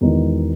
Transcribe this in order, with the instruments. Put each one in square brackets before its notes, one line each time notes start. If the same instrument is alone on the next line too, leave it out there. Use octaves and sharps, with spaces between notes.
[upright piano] E1 E2 D#3 G#3 D#4